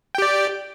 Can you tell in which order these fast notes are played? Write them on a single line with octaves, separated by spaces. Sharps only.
G5 G4 D5